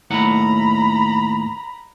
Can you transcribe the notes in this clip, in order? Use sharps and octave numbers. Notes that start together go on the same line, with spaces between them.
D#2 A2 F#5 A#5 B5